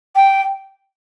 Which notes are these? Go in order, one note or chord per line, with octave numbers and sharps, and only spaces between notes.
G5